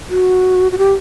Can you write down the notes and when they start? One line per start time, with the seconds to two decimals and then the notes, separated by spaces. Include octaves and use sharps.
0.09 F#4
0.72 F#4
0.78 G4